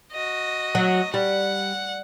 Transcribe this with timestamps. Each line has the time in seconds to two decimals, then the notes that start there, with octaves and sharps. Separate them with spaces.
0.12 F#4 D#5
0.75 F#3
1.14 G3 F#5